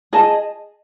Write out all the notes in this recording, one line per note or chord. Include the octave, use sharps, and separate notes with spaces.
G#4 D#5 A5